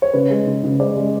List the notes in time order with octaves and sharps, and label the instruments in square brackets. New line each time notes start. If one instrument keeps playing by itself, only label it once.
[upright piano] C#5
C#3 B4
G#3
C#3
C#3
G#3 D5
G#3